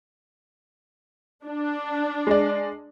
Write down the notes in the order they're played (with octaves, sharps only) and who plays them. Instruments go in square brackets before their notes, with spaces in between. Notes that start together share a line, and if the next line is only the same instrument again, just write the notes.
[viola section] D4
[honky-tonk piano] G#3 D5